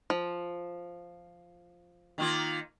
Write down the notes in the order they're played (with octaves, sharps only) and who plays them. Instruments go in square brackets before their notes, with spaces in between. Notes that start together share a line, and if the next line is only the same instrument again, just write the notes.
[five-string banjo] F3
[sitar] D#3 A#3 F4